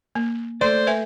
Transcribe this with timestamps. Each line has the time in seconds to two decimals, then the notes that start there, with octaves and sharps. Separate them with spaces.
0.15 A#3
0.61 A3 C5 D5 C6 G6
0.87 B4 E5 G#5